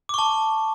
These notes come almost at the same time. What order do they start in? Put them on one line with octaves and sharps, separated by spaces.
D6 C#6 A5